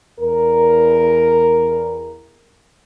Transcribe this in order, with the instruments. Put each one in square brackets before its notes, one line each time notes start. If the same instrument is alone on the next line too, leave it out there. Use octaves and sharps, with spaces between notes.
[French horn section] E2 A#4